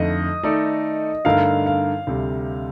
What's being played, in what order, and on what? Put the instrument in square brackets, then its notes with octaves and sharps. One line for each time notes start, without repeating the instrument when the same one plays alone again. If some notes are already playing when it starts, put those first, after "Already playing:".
Already playing: [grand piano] F2 D3 A3 D#4 [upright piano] D#5
[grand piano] D#3 A3 D#4 A4 D5
[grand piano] G2 D3 A3 D#4 A#4 [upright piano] F5
[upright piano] F5
[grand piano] D2 C3 G3